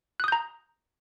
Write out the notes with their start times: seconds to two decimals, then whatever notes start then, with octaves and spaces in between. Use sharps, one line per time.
0.20 F#6
0.24 D#6
0.28 G6
0.32 A#5